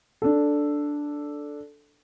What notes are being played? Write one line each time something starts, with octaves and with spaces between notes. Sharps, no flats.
D4 A4